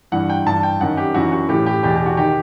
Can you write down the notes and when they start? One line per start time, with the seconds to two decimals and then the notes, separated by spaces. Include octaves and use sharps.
0.12 G2 E3 F#5
0.30 G5
0.46 G2 E3 A5
0.63 G5
0.81 F#2 D#3 F#5
0.97 G4
1.14 F#2 E3 F#4
1.32 F#4
1.49 A2 E3 G4
1.66 G4
1.83 E2 B2 G4
1.95 G4
2.06 F#4
2.17 D#3 G4